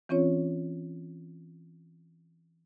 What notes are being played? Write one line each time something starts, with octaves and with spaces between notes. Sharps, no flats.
E3 C4 C#4 F4 C#5